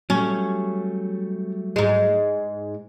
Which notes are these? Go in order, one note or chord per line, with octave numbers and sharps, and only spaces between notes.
F#3 G3 A3 C#4
G#2 G#3